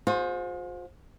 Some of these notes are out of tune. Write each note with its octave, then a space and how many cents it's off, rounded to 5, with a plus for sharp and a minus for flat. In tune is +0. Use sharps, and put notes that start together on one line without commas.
F4 +45 G#4 +0 C5 +0